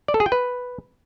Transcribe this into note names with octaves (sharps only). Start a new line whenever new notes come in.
D5
A4
G#4
G5
B4